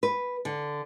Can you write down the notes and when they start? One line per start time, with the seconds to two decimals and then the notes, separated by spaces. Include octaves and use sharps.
0.03 B4
0.45 D3